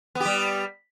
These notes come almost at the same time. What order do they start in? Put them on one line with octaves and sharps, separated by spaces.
B3 G4 G3